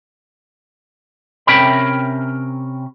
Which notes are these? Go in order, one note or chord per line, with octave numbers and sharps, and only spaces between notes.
C3 C#4 A#4 E5 G5 B5